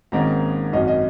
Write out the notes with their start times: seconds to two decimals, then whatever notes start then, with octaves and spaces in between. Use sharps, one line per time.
0.12 G#1 G#2 D#3 A#3 C#4 A#5
0.72 G#1 F#2 F#3 C#4 D#5
0.88 D#5